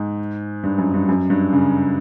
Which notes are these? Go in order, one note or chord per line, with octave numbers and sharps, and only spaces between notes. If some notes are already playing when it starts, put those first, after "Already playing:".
Already playing: G#2
G2
F#2
G2
F#2
G2
C#3